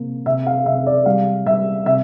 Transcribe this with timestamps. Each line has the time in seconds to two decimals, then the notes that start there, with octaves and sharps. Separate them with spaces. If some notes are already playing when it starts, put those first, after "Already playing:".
Already playing: C3 A#3
0.26 C3 E5
0.47 F5
0.66 C3 E5
0.87 D5
1.06 G3 F5
1.46 G3 E5
1.86 C3 E5